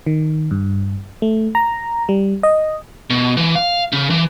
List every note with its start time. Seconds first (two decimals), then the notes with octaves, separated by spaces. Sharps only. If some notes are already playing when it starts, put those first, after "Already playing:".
0.06 D#3
0.51 G2
1.22 A3
1.55 A#5
2.09 G3
2.43 D#5
3.10 B2
3.37 E3
3.55 F5
3.93 C#3
4.10 E3